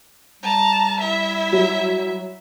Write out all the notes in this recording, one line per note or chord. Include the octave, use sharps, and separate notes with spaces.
G3 A5 A#5
E4 E5
F#3